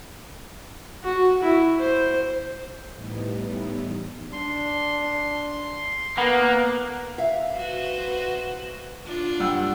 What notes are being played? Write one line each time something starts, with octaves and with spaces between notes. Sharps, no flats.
F#4
E4
C5
A2 E3 G3 B3 D#4
D4 C6
A#3 B3 F#6
E5 F5
F#4 B4 C5
D4 F4
G2 F#5 E6